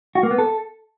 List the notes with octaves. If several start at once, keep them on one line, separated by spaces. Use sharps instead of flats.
F#4
A#3
B3
A4